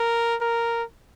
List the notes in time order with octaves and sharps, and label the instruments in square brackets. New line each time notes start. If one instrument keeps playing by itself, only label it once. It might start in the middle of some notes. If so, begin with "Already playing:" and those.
Already playing: [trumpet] A#4
A#4